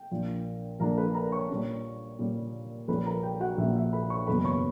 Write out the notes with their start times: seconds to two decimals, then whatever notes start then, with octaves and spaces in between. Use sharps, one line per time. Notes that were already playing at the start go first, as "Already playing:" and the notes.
Already playing: G5
0.11 A#1 A#2 A#3 D4
0.80 A#1 A#2 A#3 D4 A#4 A#5
0.98 B4 B5
1.14 A#4 A#5
1.32 C#5 C#6
1.49 A#2 G3 C#4
2.19 A#2 G3 C#4
2.88 A#1 A#2 G3 C#4 B4 B5
3.06 A#4 A#5
3.23 G4 G5
3.40 F#4 F#5
3.57 A#1 A#2 G3 C#4 E5
3.76 E5
3.93 B4 B5
4.10 C#5 C#6
4.27 F#1 E2 B2 F#3 B3 B4 B5
4.44 C#5 C#6